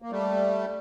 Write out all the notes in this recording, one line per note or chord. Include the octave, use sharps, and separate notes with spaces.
A#3
G3 A3